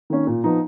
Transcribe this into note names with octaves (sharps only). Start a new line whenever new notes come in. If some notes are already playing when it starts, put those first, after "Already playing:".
D#3 A#3 C#4
A#2
F3 B3 D#4